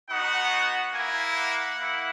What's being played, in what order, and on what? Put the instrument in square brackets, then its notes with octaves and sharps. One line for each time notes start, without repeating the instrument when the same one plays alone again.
[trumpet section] B3 D#4 F#4 F#5
A#3 E4 G#5
F#5
A#3 E4